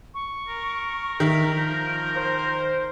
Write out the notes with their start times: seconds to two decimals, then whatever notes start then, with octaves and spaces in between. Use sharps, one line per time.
0.14 C#6
0.48 A#4
1.20 D#3 E5 B6
1.57 F3 G6
2.16 C5